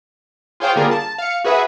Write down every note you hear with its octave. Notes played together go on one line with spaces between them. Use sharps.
F4 G#4 C5 C#5 F5 G5
D3 G3 A#3 F4 G#4 A#4
A5
F5 C#7
F#4 G#4 B4 E5